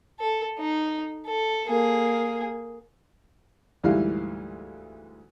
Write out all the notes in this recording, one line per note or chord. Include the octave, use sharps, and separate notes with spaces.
A4
D#4
A4
A#3 G#4
D2 G#2 E3 G3 E4 F5